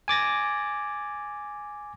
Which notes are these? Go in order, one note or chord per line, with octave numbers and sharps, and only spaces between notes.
G#5 D6 A6 A#6